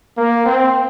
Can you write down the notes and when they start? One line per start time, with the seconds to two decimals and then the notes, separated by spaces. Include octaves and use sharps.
0.17 A#3
0.46 C4